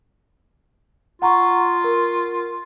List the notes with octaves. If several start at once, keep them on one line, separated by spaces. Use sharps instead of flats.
F4 F#5 A#5 C#6
A#4